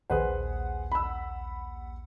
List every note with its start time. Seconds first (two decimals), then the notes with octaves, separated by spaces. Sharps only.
0.10 A#1 D#2 G#4 B4 C5 F#5
0.92 B5 E6